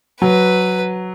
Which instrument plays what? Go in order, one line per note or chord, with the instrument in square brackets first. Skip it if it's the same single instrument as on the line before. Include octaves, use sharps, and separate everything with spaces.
[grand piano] F#3 [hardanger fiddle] B4